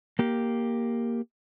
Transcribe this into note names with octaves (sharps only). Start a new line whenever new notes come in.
A#3 G4